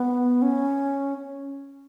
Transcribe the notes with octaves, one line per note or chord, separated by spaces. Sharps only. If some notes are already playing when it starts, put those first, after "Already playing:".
Already playing: B3
C#4